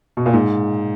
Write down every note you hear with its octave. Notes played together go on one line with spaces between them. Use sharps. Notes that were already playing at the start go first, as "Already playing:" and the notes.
B2
A#2
G#2